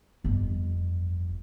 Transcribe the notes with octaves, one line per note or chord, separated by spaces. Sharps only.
G1 F2